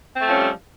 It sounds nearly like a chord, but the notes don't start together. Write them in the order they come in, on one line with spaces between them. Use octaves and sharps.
C4 A3 F3 C#4 G3